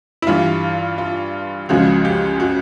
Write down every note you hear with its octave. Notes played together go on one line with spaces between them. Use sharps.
E4
G2 E3 G3 F4
F4
C#2 C#3 F3 G#3 F#4
G4
F#4